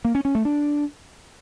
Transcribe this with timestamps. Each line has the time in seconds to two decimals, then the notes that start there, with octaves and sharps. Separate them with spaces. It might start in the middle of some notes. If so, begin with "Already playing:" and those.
0.05 A#3
0.15 C#4
0.25 C#4
0.35 A3
0.45 D4